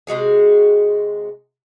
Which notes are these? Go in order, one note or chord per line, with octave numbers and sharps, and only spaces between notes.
C3 G#3 F#4 G#4